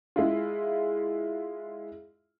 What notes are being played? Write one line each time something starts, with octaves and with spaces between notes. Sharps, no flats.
G#3 E4 F4